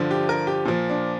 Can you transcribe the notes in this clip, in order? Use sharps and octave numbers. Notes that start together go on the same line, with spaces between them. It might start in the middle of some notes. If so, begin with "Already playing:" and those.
Already playing: G2 D3 F3
G4
A#4
G4
A#2 F3
D4